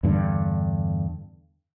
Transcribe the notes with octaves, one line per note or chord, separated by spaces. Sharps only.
E2 G2 D3